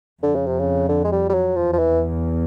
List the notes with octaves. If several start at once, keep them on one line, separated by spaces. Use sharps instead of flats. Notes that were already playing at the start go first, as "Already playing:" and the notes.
F2 D3
C#3
C3
C#3
D3
G#3
G3
G3
F#3
E2 F3
F3
E3